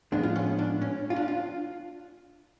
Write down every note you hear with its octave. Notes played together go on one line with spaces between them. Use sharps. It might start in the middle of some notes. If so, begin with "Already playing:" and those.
A2 F3 G#3 B3 D4
F4
C#4
D4
C#4
F4
D4
F4